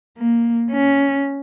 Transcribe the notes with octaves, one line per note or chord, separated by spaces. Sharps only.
A#3
C#4